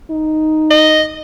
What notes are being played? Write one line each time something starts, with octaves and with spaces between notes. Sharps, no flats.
D#4
D#5